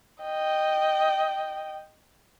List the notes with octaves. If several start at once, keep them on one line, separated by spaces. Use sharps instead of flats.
D#5 G5